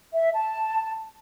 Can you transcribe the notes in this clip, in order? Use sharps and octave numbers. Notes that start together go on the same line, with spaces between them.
E5
A5